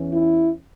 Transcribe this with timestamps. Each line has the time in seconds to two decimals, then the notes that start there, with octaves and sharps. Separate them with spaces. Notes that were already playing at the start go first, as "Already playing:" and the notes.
Already playing: E2 E3 C#4
0.12 E4